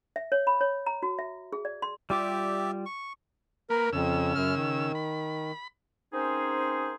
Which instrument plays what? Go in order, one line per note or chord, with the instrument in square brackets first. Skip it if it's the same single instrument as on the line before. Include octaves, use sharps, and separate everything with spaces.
[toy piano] E5
C#5
B5
C#5
A#5
F#4
E5
G#4
D5
C6
[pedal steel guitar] G3 F4 D6 [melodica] G4 D5 E5
[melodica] C#6
[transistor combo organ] A#3 B4 [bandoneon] A#4
[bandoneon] F2 [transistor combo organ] C#3 E6
[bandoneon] F#2 F6
D#3
[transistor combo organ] B5
[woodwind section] A#3 C4 C#4 D#4 G#4 C5